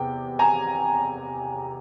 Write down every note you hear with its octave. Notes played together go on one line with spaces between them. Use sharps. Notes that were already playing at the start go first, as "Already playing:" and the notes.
Already playing: E2 C3 G5
G#5 A#5